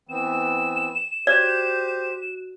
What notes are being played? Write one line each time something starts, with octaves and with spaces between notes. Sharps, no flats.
E3 B3 C4 E7
F#4 G4 C5 D5